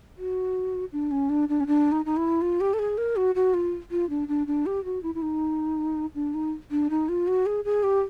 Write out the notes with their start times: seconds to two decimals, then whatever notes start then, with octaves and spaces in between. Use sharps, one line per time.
0.18 F#4
0.92 D4
1.11 C#4
1.29 D4
1.49 D4
1.60 C#4
1.67 D4
1.92 D#4
2.05 D#4
2.17 E4
2.42 F4
2.60 G4
2.74 A4
2.79 G#4
2.98 A#4
3.16 F#4
3.35 F#4
3.54 F4
3.91 F4
4.10 D4
4.28 D4
4.47 D4
4.66 G4
4.85 F#4
5.03 E4
5.15 E4
5.22 D#4
6.15 D4
6.34 D#4
6.71 D4
6.90 D#4
7.09 F4
7.27 F#4
7.46 G#4
7.65 G#4
7.83 G4